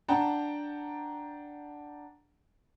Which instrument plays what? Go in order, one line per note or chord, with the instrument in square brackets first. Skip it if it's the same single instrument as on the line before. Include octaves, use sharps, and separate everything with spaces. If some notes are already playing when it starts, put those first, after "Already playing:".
[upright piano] D4 F#5 G5 A5 A#5